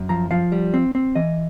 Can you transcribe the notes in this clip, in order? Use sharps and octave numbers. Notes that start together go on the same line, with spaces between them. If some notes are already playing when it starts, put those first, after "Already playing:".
Already playing: F#2
F3 A#5
F3 F5
G3
C4
C4
E3 D#5